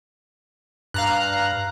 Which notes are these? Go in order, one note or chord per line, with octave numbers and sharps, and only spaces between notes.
G2 F5 A#5 F#6